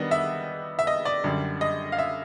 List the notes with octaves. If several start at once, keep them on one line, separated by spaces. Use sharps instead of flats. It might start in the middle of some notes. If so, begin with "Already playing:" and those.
Already playing: D#3 G3 B3 D4 D#5
E5
E5
D#5
D5
F#2 D3 G3
D#5
F5
E5